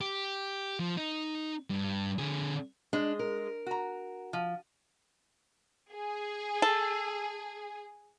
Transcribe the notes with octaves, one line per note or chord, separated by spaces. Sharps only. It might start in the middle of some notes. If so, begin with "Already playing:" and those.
G4
F3
D#4
G2
D3 G#4
G#3 D4
A#4
F#4 A#5
F3
G#4
A4